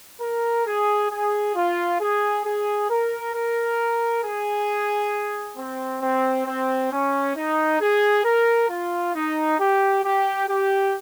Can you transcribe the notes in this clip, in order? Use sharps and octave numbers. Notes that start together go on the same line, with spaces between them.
A#4
G#4
G#4
F4
G#4
G#4
A#4
A#4
G#4
C4
C4
C4
C#4
D#4
G#4
A#4
F4
D#4
G4
G4
G4